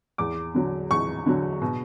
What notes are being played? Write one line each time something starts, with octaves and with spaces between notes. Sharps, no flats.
E2 D6
D3 F#3
E2 C#6
D3 F#3
B2